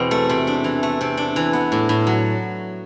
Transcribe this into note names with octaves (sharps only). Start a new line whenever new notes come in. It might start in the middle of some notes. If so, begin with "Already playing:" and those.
Already playing: E2 B2 C4
A3
C3
D4
E3
A3
C3
D4
E3
B3
A2
A2
F#3